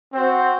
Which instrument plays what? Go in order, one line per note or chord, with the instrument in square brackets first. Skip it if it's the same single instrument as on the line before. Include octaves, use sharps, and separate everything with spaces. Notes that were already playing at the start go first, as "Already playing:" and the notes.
[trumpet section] C4 F#4 C5